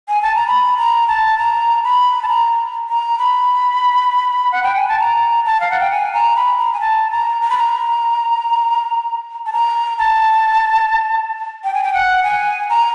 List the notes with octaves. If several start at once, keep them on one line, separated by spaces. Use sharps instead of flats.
G#5
A5
A#5
B5
A#5
A5
A#5
B5
A5
A#5
A#5
B5
F#5
G5
G#5
A5
A#5
A5
F5
F#5
G5
G#5
A#5
B5
A#5
G#5
A5
A#5
A#5
B5
A#5
A5
A#5
A5
G5
G#5
G5
F#5
G#5
A#5